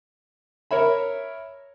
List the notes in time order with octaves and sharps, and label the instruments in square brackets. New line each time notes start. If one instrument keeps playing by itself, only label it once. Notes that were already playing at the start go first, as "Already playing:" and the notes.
[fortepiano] A#4 C#5 E5 B5